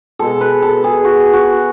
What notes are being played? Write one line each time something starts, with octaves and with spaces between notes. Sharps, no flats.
B2 G#3 A4
B4
A4
G#4
F#4
F#4